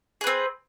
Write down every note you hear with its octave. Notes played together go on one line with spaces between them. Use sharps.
C4 G#4 B4